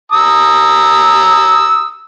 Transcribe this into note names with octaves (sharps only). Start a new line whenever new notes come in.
A#5 D#6 E6